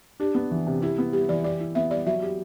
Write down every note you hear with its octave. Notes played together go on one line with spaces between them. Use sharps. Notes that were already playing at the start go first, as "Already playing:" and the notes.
D4 G4
B3
E3
C3
E4 G4
B3
G3 G4
E3 D5
G4 D5
E4
B3 E5
G3 D5
F#3 E5
G4